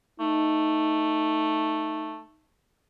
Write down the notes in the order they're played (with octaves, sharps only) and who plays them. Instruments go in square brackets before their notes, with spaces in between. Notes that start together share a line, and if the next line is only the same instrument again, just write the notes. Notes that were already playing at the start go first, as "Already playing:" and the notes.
[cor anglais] A3 [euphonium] D#4